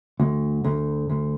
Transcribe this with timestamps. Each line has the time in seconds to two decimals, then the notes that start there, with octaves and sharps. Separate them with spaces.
0.20 D2
0.64 D2
1.09 D2